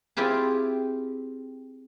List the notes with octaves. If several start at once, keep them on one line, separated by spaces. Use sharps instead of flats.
C4 E4 F4 G4 G#4